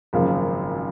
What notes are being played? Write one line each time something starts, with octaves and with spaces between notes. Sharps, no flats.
G#1 F#2 C#3 F3 A#3